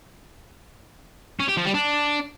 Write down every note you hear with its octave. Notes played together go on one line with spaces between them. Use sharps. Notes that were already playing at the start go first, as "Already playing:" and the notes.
C#4
G4
F3
G3
D4